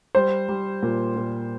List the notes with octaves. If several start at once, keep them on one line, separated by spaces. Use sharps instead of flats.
G3 C5
G3
A#2
A#2